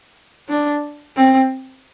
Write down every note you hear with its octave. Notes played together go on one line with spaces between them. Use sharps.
D4
C4